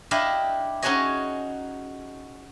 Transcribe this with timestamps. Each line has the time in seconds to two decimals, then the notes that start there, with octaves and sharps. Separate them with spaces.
0.11 D4 E4 G4 D#5 F5
0.82 C#4 D#4 F#4 G#4 C#5 D#5